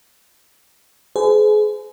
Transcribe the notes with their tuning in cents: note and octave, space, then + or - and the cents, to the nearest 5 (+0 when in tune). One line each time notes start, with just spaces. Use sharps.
G#4 +30 C5 -45